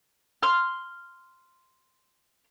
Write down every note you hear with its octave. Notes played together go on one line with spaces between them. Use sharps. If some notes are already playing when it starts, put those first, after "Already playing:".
C6 F6